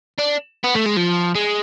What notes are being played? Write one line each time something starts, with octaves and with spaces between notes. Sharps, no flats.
D4
B3
A3
G#3
F3
G#3